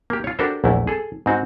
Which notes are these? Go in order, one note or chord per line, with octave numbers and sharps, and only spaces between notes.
A#3 G4
F4 C#5
D4 F#4 G4 A4 A#4 C5
A#1 E2 A3 E4
G#4 A4
G#2 C4 F#4